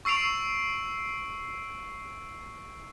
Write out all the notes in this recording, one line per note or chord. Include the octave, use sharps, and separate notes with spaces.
C#6 E6 C7 D7 F7